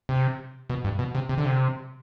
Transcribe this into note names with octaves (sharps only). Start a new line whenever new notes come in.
C3
B2
G2
B2
C3
C3
D3
C3